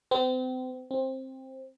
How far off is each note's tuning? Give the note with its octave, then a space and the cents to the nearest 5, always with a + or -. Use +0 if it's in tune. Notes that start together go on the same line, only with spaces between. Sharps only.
C4 -35
C4 +15